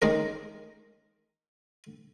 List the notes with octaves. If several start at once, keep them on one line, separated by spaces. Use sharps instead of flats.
D#3 G#3 C#4 A#4